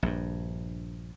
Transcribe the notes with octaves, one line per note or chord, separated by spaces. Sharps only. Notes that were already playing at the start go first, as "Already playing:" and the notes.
A#1 G2